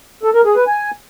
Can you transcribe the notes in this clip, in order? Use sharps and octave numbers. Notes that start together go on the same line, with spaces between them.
A4
A#4
G#4
B4
G#5